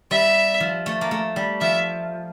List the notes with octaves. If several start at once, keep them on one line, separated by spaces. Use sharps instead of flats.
G3 E5
F3
A3
A#3
A3
G3
F3 E5